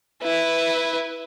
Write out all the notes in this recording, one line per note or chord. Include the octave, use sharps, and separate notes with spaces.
E4 B4